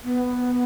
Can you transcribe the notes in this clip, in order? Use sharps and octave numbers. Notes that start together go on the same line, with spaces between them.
B3